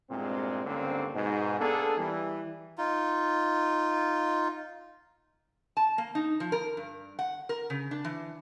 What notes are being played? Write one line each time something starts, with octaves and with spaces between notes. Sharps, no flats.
E2 G2 A#2 G#3 C4
C#2 G2 D3 A#3 C4 C#4
G#2 B2
A#3 B3 D4 G#4 A4
E3 G3
D#4 F4
A5
A#3
D#4
F3
A#4
G2
F#5
A#4
C#3
D4
E3